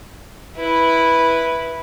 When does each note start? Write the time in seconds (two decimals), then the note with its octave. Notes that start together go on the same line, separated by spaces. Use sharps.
0.56 E4 B4